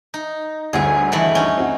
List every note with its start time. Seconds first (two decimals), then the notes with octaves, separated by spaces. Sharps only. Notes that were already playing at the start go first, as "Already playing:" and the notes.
0.14 D#4
0.73 G1 D2 D3 G#4 G#5
1.12 D#3 E3 A3
1.35 C#4 D#4
1.57 C4 F#4